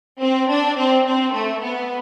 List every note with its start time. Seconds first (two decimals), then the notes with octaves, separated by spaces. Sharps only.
0.21 C4
0.49 D4
0.78 C4
1.06 C4
1.34 A3
1.62 B3